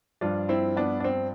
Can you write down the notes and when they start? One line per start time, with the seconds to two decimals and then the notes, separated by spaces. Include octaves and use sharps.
0.21 G2 F3 D4 F4
0.49 C4 E4
0.77 B3 D4
1.00 D4
1.04 C4